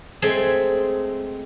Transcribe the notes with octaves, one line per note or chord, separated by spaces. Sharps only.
G#3 A3 C4 G#4